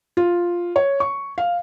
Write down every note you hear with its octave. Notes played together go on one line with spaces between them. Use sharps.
F4
C#5
C#6
F5